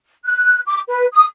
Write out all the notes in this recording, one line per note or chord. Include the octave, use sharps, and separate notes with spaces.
F#6
D6
B4
D#6